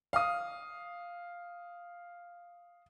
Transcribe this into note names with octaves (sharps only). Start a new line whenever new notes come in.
F5 D#6